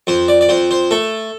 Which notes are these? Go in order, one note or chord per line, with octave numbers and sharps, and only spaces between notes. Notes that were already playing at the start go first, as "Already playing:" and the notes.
F2 C5
D5
D5
F2 C5
C5
A3 A4